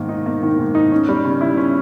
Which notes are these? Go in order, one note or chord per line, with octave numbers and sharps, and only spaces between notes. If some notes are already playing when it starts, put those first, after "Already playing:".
Already playing: G#2 D#3 A#3
D#4
A#3
D#3
G#2
D#4
C#4
G3
C#3
E4
C#4